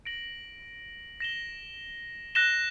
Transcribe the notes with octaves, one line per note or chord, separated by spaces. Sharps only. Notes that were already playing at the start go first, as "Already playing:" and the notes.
A#6 D7 F#7
A#6 E7 G7
F#6 A#6 E7 G7